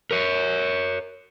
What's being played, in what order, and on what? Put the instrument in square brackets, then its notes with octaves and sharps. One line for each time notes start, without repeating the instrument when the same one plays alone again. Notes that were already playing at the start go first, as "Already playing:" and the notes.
[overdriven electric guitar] A#4 C#5